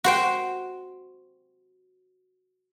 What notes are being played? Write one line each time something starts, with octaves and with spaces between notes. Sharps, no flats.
F#4 C5 G5